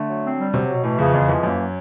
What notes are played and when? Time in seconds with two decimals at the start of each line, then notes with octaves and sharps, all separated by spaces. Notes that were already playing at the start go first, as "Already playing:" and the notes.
Already playing: D3 A3
0.09 F#3
0.24 C4
0.38 G3
0.54 C3 F#3
0.69 B2
0.83 A2 E3
0.98 F2 C#3
1.13 E2 G#3
1.28 F2 E3
1.43 F#2 A#3
1.58 F#3